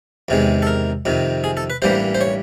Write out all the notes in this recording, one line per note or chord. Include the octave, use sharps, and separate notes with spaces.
E2 C3 D#3 G#3
A4
A#4
F2 C3 D#3
G#4
A4
B4
A1 G2 E3 G3 A#3 C5
C5
C#5